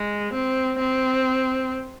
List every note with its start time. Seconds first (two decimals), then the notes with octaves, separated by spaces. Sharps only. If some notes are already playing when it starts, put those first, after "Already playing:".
Already playing: G#3
0.33 C4
0.78 C4